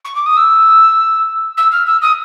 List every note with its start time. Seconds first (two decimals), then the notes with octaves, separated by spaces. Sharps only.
0.05 C#6
0.15 D6
0.26 D#6
0.37 E6
1.57 E6
1.72 F6
1.86 E6
2.02 D#6